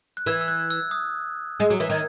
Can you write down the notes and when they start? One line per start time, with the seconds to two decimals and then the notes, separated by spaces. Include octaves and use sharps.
0.17 F#6
0.26 E3 E6 G#6
0.41 E6
0.48 F#6
0.70 E6
0.91 D#6
1.60 G#3
1.70 F#3
1.80 E3
1.90 D#3 G#6